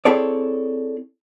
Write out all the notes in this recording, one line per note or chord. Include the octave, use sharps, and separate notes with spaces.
C4 E4 G#4 A4 C#5 D5